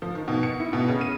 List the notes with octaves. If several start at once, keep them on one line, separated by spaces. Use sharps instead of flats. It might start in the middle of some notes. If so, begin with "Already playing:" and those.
F3
D#3
B2
C#7
E4
B2
C#3
D#7